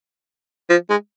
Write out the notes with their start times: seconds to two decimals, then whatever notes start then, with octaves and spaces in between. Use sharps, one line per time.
0.70 F3
0.90 G#3